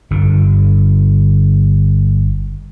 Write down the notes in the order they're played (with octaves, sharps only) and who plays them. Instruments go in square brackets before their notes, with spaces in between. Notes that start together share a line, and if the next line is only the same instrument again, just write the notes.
[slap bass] G1 D3